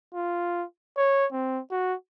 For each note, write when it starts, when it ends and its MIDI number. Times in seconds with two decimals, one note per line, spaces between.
0.15 0.64 65
0.98 1.26 73
1.33 1.61 60
1.71 1.94 66